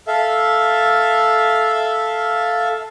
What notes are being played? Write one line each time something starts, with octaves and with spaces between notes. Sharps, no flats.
A4 E5 F5